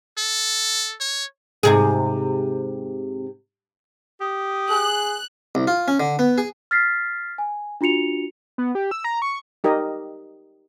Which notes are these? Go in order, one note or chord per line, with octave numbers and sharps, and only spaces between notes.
A4
C#5
G#2 C3 G#4
G4 D#6
G#4 F#6
C2
F4
C#4
D3
B3
G#4
F6 A6 B6 C7
G#5
D4 F4 F#4 C#7 F7
B3
G4
E6
A#5
C#6
D#4 G4 A#4 D#5